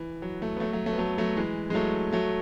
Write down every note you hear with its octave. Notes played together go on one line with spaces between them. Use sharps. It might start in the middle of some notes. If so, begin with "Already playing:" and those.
Already playing: E3
F#3
F#3 A3
B3
F#3 A3
F#3 A3
F#3 A3
B3
F#3 A3
F#3 A3
E3 G#3
G#3
F#3 A3
F#3 A3